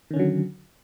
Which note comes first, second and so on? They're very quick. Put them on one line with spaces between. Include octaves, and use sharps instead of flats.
D#3 C#4 D3 F#3